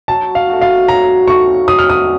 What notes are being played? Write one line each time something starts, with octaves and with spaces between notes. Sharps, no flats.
F#3 A5
F5
A3 D#4 F#4
F5
F#3 A#5
A3 D#4 F#4 C#6
F#3 D#6
F6
D#6